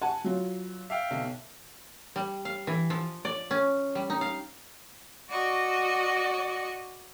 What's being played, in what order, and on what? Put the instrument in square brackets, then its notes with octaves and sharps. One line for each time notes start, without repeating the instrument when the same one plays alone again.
[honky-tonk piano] F#5 G#5 A5
F#3 F4
[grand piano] E5 F5 G5
[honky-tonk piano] B1 B2
[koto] G3
F5
E3
F3
D5
C#4
G3
D#4
F5
[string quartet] F#4 D5 D#5 C#6